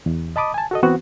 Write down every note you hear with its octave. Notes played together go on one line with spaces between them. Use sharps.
E2
D#5 A5 B5 D6 D#6
G#5 A5
F#4 A4 D#5
E3 B3 C4 F#4